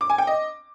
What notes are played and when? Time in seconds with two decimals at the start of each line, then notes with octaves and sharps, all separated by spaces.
0.01 D6
0.10 G#5
0.18 G5
0.27 D#5